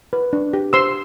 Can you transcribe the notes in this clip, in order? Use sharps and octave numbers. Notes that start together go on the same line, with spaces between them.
B4
D4
G4
C5 C6 E6